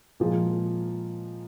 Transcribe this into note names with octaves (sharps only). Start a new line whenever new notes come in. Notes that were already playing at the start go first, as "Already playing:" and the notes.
A#2 F3 G#3